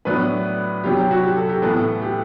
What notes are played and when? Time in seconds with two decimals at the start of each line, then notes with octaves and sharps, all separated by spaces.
0.05 A2 F#3 B3 D4 B4
0.84 C3 F#3 B3 G4
0.97 G4
1.11 F#4
1.23 G4
1.36 A4
1.49 G4
1.62 A2 E3 B3 A4
2.02 G4